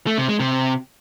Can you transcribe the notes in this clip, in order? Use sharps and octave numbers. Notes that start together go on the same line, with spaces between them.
A3
C3
G#3
C3